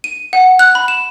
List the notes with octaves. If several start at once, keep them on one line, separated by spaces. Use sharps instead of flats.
D#7
F#5
F#6
B5
E7